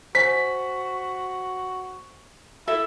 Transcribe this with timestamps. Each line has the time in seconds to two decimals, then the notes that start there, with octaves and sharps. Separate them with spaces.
0.15 F#4 C5 G#5 B6
2.67 E4 A4 E5